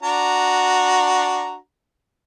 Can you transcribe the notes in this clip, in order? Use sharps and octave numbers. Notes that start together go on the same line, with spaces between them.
D4 F#4 A#5